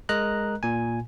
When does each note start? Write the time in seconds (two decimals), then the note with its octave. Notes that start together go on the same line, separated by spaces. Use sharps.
0.09 G#3 A#4 D#5 A#5 F#6
0.63 A#2 G#5